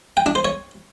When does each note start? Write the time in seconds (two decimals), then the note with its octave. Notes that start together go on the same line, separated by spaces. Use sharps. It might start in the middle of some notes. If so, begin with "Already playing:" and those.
0.17 G5
0.26 D4
0.35 C5
0.45 C#5